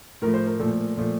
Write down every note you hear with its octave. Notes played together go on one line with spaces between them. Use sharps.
A2 F3 A3 A#4
C5
A#4
A#2 F3 A3 A4
A#2 F3 A3